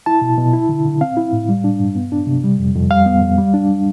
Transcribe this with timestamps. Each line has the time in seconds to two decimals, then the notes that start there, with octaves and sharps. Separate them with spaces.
0.06 E4 A5
0.22 B2
0.38 B2
0.53 E4
0.69 D3
0.86 D3
1.01 C4 F5
1.17 E4
1.33 A2
1.49 G3
1.64 D4
1.80 G2
1.95 B3
2.12 D4
2.27 C3
2.44 G3
2.59 F2
2.75 F2
2.91 G3 F5
3.06 B3
3.22 F2
3.38 G3
3.54 D4